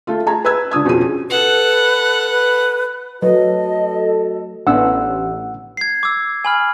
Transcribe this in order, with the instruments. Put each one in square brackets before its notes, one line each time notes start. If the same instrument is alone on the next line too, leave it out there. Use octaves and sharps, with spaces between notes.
[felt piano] A3 F4
G#4 A5 A#5 G#6
B4 E6 G#6
C#2 D4 D#6 G#6
F2 B2 C#4 G#4 D#7
[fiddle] A4 F#5 [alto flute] B4
[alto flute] B4
[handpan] F#3 [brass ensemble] A3 F#4 A4 [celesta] B4 [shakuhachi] D#5
[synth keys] A1 [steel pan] B3 C#4 D4 [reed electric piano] F#5 E6
[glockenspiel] G#6 C7
D6 E6
G#5 B5 F6